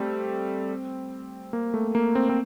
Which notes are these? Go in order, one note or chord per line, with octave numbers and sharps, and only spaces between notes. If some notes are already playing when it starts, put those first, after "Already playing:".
Already playing: G3 A3 C4
A#3
A3
A#3
C4
C4